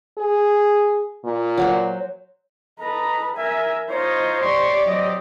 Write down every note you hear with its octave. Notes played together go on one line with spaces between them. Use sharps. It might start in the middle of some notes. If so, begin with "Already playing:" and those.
G#4
A#2
F#3 F#4 C5
A4 B4 D#5 A#5
A#4 E5 G#5
D#4 F4 C5 C#5 D#5
G4 C#5 D5 C6 C#6
F#3 C4 D#5